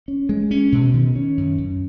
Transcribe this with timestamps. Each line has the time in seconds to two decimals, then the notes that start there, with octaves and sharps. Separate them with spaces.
0.08 C#4
0.29 G#3
0.51 C#4
0.72 B2
0.94 D#3
1.15 C#4
1.37 F#2
1.58 F#2